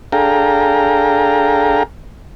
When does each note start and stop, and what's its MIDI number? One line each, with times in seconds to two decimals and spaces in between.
0.12 1.83 62
0.12 1.83 68
0.12 1.83 69
0.12 1.83 77
0.12 1.83 79
0.12 1.83 82